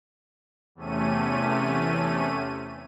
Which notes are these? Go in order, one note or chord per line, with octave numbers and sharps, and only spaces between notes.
E2 C3 A3 C#4 D#7